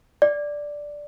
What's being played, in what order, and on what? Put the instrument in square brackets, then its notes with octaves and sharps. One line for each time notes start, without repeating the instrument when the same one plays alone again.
[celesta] D5